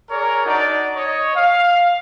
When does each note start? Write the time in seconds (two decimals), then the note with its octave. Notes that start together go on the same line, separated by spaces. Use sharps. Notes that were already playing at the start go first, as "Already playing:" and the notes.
0.10 G#4 A#4 C#5 D5
0.46 D4 D#4 F#4 D5
0.96 C#5 D#5
1.35 F5